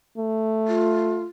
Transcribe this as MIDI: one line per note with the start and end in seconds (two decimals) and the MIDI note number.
0.17 1.25 57
0.68 1.23 65